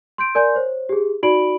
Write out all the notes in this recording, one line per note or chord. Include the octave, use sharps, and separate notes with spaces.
C6 G6 D7
A#4 D5 G#5 C6 G6
C5 C#5
G4 G#4
D#4 F#4 D5 B5 D7 F#7